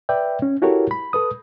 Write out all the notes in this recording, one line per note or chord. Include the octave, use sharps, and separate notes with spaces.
B4 D5 E5 G5
C#4
E4 F#4 G4 A4 A#4 C#5
B5
A4 B4 D#6